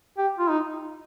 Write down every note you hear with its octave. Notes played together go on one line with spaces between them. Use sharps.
G4
F4
D#4